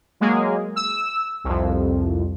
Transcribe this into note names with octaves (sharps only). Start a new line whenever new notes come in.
F#3 G#3 A#3 G#4
E6
C2 F2